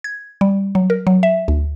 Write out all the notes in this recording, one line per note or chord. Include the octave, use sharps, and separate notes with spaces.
G#6
G3
F#3
A#4
F#3
E5
D2